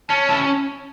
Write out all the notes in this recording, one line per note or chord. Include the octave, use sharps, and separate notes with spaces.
C#4 A5
E4 A5